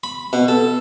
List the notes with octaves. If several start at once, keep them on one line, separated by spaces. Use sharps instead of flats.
B5
B2
A4